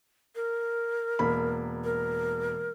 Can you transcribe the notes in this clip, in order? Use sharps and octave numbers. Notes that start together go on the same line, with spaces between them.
A#4
E1 A#3 B5
A#4